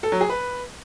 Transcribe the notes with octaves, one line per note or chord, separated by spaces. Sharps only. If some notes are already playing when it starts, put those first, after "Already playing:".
A4
F#3
G#4
B4